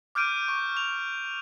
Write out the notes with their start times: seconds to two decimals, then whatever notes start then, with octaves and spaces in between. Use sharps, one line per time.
0.15 D6 F6 G6 D7 D#7
0.48 C#6
0.77 F7